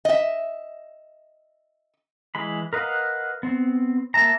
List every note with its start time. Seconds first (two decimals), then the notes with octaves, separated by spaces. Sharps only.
0.05 D#5 E5
2.35 E3 G#3 B5
2.73 A#4 B4 D#5 F5 F#5
3.43 B3 C4
4.14 A#3 E5 A5 A#5